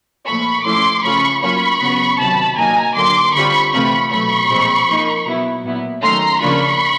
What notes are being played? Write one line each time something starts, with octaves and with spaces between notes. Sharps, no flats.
A#2 F3 A3 B5 C#6
F3 A3 C#4 E4 C6 D6
C#3 F3 A3 C#4 F4 B5 C#6
F#3 A#3 C#4 F4 B5 C#6
C#3 F#3 B3
C3 D#3 F#3 A5 B5
A#2 F#3 A#3 D#4 G#5 A#5
D3 F#3 A#3 C6 D6
D3 G3 C4 F4 B5 C#6
C3 E3 A3 C4 F4 B5 C#6
B2 F#3 A3 B5 C#6
A#2 F3 G#3 C4
F3 A#3 D#4
B2 F#3 B3 E4
A#2 F#3 B3 E4
D#3 F#3 A3 C#4 A#5 C6
C#3 F3 A#3 D4 F4 B5 C#6